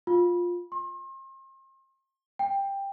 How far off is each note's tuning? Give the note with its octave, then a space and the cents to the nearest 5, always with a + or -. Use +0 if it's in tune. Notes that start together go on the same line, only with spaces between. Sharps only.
F4 +10
C6 +40
G5 +10